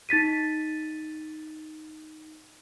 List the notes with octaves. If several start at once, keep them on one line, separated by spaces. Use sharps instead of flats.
D#4 A6 B6 D#7